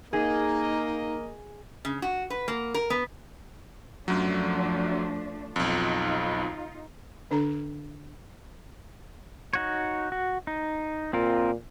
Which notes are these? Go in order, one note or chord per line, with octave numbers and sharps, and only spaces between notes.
A#3 D#4 G#4 A#4 D#5
C#3
F#4
B4
A#3
A#4
B3
F#2 F3 F#3 A3 D4
B1 F2 D#4 F4
D3 D4 A4 A#5
D#4 F#4 C#5
F#4
D#4
A#2 C4 F4 A#4